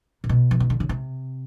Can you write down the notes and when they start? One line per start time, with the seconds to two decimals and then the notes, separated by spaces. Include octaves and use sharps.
0.24 A#2
0.29 B2
0.51 E3
0.60 D#3
0.70 D3
0.80 C#3
0.89 C3